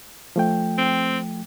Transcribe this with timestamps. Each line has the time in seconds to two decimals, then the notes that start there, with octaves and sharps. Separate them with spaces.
0.36 F3 A3 G5
0.78 C4